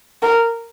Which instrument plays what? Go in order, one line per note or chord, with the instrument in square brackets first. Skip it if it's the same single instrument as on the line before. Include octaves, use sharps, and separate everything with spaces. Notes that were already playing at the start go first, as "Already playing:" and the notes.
[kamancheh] A#4